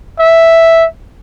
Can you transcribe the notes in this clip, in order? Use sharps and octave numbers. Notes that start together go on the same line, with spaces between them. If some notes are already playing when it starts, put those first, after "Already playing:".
E5